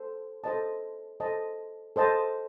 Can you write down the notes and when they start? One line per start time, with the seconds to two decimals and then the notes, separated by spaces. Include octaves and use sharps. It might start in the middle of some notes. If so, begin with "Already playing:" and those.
Already playing: A4 C5
0.44 A4 C5 D#5 A5
1.20 A4 C5 D#5 A5
1.96 A4 C5 D#5 A5